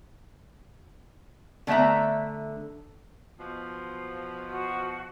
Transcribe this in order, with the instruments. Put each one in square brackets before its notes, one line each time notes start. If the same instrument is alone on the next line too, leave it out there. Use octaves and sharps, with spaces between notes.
[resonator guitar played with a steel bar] D3 A3 B3 E5 A#5
[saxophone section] B2 F3
[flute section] F#4